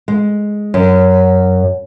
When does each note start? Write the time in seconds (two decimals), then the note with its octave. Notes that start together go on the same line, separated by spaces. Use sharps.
0.08 G#3
0.74 F#2